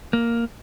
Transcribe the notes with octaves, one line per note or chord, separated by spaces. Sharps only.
A#3